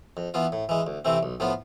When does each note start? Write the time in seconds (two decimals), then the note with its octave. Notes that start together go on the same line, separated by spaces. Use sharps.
0.17 F2
0.34 E3 B3 F4
0.52 A2
0.69 E3 G#3
0.87 D2
1.05 C3 E3 A3 C4
1.23 B1
1.40 A2 F3 B3 F4